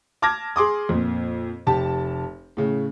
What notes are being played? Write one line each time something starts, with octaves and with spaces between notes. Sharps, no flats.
A5 D6 F6 G#6 A#6
G#4 C6 D6 D#6
F2 A#2
F1 G4 A5
A2 C#3